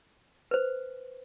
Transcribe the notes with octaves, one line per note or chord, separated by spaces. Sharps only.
B4 C5